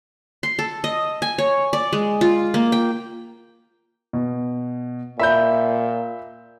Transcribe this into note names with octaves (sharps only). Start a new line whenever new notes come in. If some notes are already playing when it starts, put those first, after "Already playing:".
C6
A4
D#5
G#5
C#5
D5
G#3
F4
A#3
G5
B2
A#2 E5 B5 G6